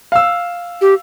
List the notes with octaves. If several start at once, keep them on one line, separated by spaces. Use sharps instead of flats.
F5 E6
G4